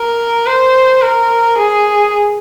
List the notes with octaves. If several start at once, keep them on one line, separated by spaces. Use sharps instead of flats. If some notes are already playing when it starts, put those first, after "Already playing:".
Already playing: A#4
C5
A#4
G#4